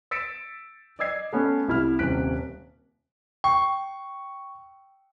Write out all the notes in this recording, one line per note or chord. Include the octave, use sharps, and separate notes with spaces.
E6 A6 B6 C#7 D7 E7
D5 D#5 E6 G#6 C7
A3 B3 C#4
C2 E4 F6
D#1 C3 C#4 F#6 B6 D7
G5 C#6